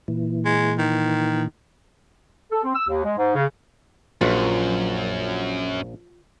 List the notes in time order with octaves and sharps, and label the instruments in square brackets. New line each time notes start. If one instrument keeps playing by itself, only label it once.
[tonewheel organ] A#2 E3
[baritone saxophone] G#3
D#3
[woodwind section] A4
C4
E6
D#2
G#3
G#2
C#3
[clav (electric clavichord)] A#1 [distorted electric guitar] F#2 [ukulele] F4 F#4